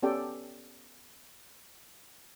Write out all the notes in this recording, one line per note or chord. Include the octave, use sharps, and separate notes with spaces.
B3 C#4 G4 A4 D5 G5